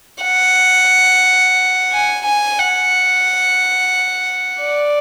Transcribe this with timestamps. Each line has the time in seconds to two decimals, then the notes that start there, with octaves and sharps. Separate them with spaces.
0.23 F#5
1.92 G#5
2.26 G#5
2.59 F#5
4.62 D5